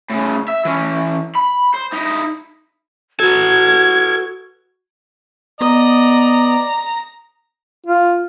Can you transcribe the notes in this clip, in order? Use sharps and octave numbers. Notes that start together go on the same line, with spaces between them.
A2 C#3
E5
E3 C#4
B5
C5
D#4 E4
F#4 A4 B4 G#6
B3 D5 D#5 A#5
F4